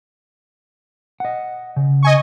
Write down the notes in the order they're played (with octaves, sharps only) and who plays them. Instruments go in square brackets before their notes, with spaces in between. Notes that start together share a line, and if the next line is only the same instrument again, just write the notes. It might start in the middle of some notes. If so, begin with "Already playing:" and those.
[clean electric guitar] D#5 F#5
C#3
[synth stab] D#5 G#5 C#6